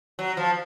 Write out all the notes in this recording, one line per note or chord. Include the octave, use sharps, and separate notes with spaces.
F#3
F3